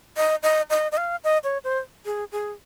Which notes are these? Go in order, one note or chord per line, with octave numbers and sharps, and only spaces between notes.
D#5
D#5
D#5
D#5
F5
D#5
C#5
C5
G#4
G#4